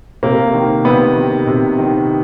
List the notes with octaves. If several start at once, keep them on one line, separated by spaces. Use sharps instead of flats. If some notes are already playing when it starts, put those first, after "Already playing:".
C3 A#3
D#3
C3 B3
D#3
C3
D#3